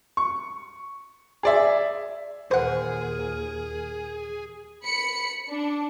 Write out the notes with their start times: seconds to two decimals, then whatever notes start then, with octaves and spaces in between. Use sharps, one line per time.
0.17 C#6
1.43 G#4 D5 E5
2.51 D#2 A#2 G#4 A#4 C5 F#5
4.84 B5 C#7
5.49 D4